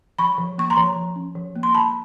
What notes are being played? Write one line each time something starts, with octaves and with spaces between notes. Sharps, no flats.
F3 B5 C#6
F3
A#3 C#6
A#5 C6
F3
F3
C#4
F3
A#3
C6
A#3 A5 B5